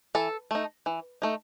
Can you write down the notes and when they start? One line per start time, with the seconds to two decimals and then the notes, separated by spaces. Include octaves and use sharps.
0.15 E3 A4
0.51 A3 D#4
0.86 E3
1.22 A3 D#4